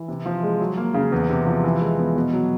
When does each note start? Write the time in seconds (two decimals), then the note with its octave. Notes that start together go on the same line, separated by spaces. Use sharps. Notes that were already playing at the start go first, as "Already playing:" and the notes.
Already playing: E3
0.08 C3
0.26 F3
0.43 G#3
0.60 F#3
0.77 A#3
0.94 C#3
1.12 E2
1.30 C3
1.47 F3
1.64 E3
1.81 G#3
1.99 B3
2.16 B2
2.33 F#3